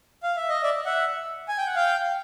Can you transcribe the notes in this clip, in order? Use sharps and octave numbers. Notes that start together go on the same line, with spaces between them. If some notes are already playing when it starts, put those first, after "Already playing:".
F5
E5
D#5
D5 E5
E5 F#5
G#5
G5
F#5
F5 G5